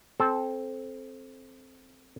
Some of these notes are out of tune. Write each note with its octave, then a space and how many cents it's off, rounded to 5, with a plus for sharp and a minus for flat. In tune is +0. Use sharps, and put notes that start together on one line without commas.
C4 +0 A4 -20